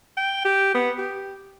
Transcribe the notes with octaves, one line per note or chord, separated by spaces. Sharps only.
G5
G4
B3
G4